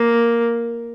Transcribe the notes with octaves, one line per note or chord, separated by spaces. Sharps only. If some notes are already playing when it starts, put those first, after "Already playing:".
Already playing: A#3